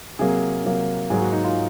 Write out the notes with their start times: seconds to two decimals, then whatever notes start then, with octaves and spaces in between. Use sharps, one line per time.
0.19 C3 F#3 A#3 G#4
0.65 C3 F#3 A#3
1.10 G#2 F#3 A#3 G#4
1.21 F#4
1.32 D#4
1.44 F4